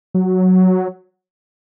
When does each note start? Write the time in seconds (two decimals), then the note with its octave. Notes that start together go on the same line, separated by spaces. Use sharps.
0.14 F#3